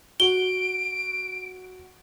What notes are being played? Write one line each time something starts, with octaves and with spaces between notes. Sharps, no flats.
F#4 D7 G7